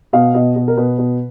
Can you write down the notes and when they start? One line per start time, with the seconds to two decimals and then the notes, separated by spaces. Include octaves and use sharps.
0.13 B2 F5
0.34 B2 D#5
0.56 B2
0.68 A#4
0.77 B2 B4
0.98 B2